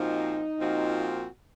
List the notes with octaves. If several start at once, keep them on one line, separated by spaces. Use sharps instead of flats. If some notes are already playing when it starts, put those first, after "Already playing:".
Already playing: A#2 F3 C4 D#4 F#4
A#2 F3 C4 F#4